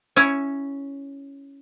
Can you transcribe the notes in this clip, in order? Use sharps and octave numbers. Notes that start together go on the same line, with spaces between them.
C#4 E4 C#5